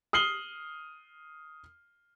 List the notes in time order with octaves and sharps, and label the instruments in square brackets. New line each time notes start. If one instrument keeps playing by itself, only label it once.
[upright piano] D#6 F6 C7 F#7 G7